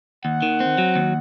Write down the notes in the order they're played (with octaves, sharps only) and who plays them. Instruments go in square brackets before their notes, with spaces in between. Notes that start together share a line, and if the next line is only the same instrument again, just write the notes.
[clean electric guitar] D#2 [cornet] F#5
[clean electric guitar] D#3
C4
F#3
D#2